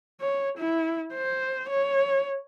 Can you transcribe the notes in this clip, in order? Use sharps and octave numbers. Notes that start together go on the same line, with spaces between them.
C#5
E4
C5
C#5